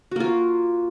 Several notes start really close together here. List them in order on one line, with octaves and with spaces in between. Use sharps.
F#4 A#3 F4